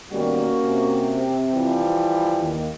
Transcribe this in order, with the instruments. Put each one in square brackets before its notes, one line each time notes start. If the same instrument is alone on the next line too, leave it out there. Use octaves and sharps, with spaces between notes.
[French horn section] B2 D#3 G3 [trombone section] A#3 C#4 F#4
[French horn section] C3
[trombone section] E3 F3 G3
[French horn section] D#2